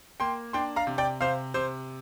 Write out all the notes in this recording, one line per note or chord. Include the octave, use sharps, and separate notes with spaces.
A#3 G5 C6
D4 G5 C6
F5 A#5
C3
D5 G5
C3 C5 F5
C3 C5